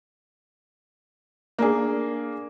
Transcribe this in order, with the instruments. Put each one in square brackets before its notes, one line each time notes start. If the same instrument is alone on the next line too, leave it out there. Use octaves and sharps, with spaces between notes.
[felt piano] A#3 D4 G#4